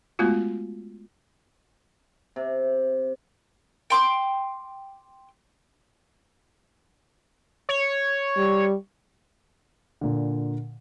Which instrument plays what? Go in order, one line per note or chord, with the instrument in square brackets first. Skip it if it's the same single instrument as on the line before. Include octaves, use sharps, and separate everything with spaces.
[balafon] G#3 A3 B3 F4 F#4
[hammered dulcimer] C3
[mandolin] G5 C6 D6
[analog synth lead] C#5
[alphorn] G3
[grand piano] A#2 D3